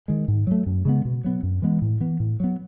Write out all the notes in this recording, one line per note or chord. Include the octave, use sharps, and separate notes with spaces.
D#3 G#3
G#2
F#3 A3
F#2
C#3 G#3 B3
B2
F#3 B3
F#2
E3 G#3 B3
A2
E3 B3
A2
F#3 B3